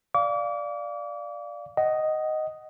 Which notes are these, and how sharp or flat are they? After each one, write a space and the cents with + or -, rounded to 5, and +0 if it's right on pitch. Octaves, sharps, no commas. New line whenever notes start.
D5 +0 F5 +0 D6 -35
D#5 +0 F#5 +25